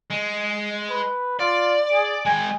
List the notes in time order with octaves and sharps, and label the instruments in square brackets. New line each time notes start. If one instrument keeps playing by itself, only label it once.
[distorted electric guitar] G#3
[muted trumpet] B4
[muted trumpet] F4 [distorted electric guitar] D5
[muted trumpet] G#4
[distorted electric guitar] G#3 G5 [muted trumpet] G#5